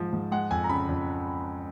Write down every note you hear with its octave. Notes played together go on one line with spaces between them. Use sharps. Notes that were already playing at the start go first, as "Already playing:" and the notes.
Already playing: G#2 F3
G#2
G#3 F#5
F2 G#5
A#5
C#3 B5
F2